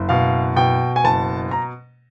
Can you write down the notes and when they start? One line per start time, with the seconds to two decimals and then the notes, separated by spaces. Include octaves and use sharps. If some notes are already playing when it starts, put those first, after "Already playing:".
Already playing: F#1
0.09 B2 F5
0.56 B2 G5
0.96 G#5
1.04 F#1 A5
1.51 A#5